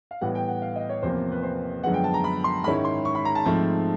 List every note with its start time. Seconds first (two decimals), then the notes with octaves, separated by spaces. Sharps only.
0.11 F5
0.21 A2 E3 G3 B3 F#5
0.35 G5
0.49 F#5
0.62 F5
0.76 D#5
0.89 C#5
1.02 E2 C3 F3 A#3 C5
1.32 B4
1.43 C5
1.83 F#2 D3 F3 G#3 B3 F#5
1.94 G5
2.04 A5
2.14 A#5
2.24 B5
2.44 C6
2.64 G#2 D#3 G#3 C#4 E4 B5
2.85 C6
3.05 C#6
3.15 B5
3.25 A#5
3.35 A5
3.46 G#2 F3 A3 C4